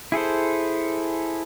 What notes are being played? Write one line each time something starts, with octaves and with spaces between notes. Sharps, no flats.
E4 G#4 A4 C5